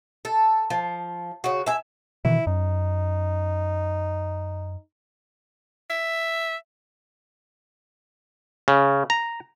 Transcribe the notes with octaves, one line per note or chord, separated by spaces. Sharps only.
A4
F3
C#3 F#4
E5 G#5
B2 D#3 E3 E4
F#2 D#4
E5
C#3
A#5